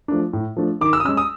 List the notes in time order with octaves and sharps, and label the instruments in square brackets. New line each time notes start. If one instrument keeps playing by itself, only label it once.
[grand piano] F3 A3 D4
A2
F3 A3 D4
D#3 D6
E6
D#6
G#3 C#4 E6
D#6